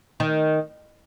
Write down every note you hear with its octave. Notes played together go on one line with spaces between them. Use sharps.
D#3